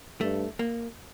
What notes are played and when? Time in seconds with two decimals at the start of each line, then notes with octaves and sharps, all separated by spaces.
0.21 G2 A3
0.59 A#3